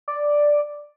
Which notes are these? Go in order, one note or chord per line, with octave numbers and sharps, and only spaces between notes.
D5